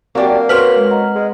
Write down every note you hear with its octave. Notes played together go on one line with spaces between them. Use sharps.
F#3 A#3 C4 D4 G4 F#5 G#5
C#4 F#4 B4 C5 F6
G#3
D#5 F#5 A#5
G#3